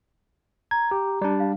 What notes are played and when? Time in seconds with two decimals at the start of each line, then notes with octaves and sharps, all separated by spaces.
0.71 A#5 G#6
0.91 G4
1.22 G3 D4
1.40 F5